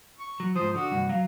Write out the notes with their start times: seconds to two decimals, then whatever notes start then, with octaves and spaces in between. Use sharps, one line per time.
0.19 C#6
0.40 F#3
0.56 G#2 F3 C5 D#6
0.75 D3 F#4
0.92 C2 G2 F#5
1.09 F#3 F5